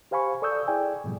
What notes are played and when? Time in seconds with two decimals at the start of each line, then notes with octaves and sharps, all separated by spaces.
0.11 G4 C5 F5 G#5 B5 C#6
0.42 A4 D5 C#6 D#6 E6 G6
0.68 E4 G#4 D5 G5 G#5
1.04 G#2 B2 F3 G3